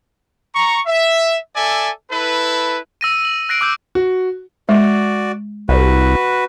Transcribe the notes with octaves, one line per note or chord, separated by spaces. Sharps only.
A#5 C#6
E5
A4 D5 E5 G#5
E4 A4 B4
E6 A#6 D#7
D#7 F#7
F#6 A#6 C7 D7
D6 E6 G6
F#4
G#3 F#4 D5
C2 F#4 B4